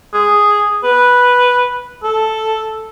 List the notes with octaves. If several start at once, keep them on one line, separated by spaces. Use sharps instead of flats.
G#4
B4
A4